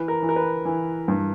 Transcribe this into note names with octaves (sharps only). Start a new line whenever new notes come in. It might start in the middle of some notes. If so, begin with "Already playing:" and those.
Already playing: E3 B4
A#4
E3
A#4
B4
E3
G2